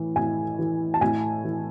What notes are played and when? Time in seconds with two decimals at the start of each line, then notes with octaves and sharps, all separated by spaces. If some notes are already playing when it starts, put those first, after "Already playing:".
Already playing: A2 E3
0.16 A2 G#5
0.59 E3
0.94 A5
1.01 A2 G#5
1.44 E3